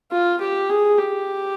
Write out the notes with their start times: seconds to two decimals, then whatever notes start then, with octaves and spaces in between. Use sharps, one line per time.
0.12 F4
0.41 G4
0.69 G#4
0.98 G4